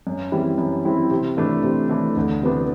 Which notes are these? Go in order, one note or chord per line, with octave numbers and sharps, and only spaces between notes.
F#2
E3 G3 C4 E4
F#2
E3 G3 C4 E4
C3
E3 A3 D4
C3
E3 A3 D4
D2
C3 E3 B3 D4